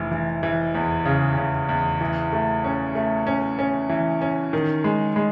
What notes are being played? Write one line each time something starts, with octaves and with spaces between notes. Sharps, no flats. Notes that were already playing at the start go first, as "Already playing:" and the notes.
Already playing: F1 E3
E3
E3
E2
C#3
C#3
E2
E3
A3
C#4
A3
C#4
C#4
E3
C#4
D#3
G#3
G#3